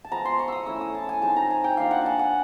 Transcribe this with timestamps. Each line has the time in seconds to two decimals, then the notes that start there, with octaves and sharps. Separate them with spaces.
0.05 A5
0.11 F3 G#3 B3 A#5
0.25 C6
0.39 C#6
0.48 D#6 E6
0.66 A3 C#4 E4 E6
0.81 D#6
0.95 A5
1.09 G#5
1.22 F3 G#3 C4 D#4 A5
1.36 A#5
1.50 G#5
1.64 G5
1.77 A#3 D4 F4 F5
1.91 F#5
2.01 G#5 A5
2.19 F#5